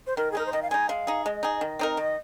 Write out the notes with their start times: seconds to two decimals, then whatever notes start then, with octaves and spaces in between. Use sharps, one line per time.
0.07 C5
0.17 D#3 A#4
0.32 G#4
0.35 G#3 D#4 A#4
0.46 C5
0.53 D#3 D#5
0.62 F5
0.70 G#3 D#4 G#5
0.89 G#3 F5
1.07 D#4 G#4
1.25 G#3 D#5
1.43 D#4 G#4
1.61 D#3
1.79 C4 D#4 A#4
1.97 D#3 D#5